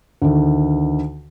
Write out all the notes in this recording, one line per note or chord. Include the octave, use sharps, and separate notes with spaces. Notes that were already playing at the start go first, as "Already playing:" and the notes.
D2 D#3